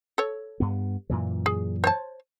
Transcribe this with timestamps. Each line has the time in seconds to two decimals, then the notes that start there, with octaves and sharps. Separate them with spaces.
0.18 A4 C#5
0.60 G2 B3
1.10 F#2 A#2 E3
1.46 G#4
1.84 C5 C#5 A5